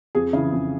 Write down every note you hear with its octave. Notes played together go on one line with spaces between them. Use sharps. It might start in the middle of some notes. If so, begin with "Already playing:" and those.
F2 G#4
C#3 E3
F2